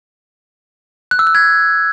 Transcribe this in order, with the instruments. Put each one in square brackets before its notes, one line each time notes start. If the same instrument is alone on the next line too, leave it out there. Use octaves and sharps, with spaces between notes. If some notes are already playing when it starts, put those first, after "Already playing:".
[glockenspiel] F#6
E6
F#6
G#6